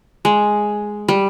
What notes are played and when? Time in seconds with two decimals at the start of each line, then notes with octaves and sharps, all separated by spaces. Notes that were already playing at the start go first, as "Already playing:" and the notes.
0.25 G#3
1.08 G3